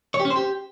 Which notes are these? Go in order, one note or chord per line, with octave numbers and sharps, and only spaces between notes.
C#5
G4
C#4
C5
G4